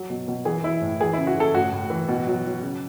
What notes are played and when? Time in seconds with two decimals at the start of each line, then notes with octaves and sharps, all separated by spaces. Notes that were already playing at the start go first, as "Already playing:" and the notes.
Already playing: F#3
0.10 B2
0.28 B2
0.45 E3 G#4
0.63 E3 E4
0.81 A2
1.00 E3 G#4
1.13 C#3 E4
1.27 F#4
1.36 C#3 A4
1.55 A2 F#4
1.72 A2
1.90 E3
2.08 B2
2.27 F#3
2.45 F#3
2.62 C#3